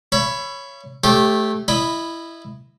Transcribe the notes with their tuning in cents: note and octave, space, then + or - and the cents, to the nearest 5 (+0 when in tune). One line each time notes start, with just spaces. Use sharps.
C#5 +0 E5 +40 B5 +0
A3 -15 G4 +0 C#5 -40
E4 +10 D#5 -15 B5 +0